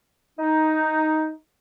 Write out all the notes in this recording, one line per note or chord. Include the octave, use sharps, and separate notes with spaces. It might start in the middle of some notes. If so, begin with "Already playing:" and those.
D#4